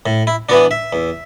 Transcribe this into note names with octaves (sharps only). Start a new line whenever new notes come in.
A2
E4
E3 B3 D4 F#4
E5
E2